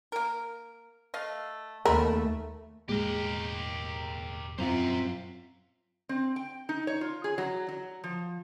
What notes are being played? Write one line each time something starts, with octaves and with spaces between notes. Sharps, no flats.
A#3 A#4
A3 D#5 F5
D#2 C#3 A3 A#4 B5
E1 A2 G#3 A#3 G4 A#4
F#2 C4 F4 C5 A#5
C4
G5
D#4
C#5
F4
G#4
F#3
F#3
F3